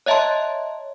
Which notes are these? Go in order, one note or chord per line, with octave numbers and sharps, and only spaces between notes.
C#5 D#5 E5 A5 A#5 C6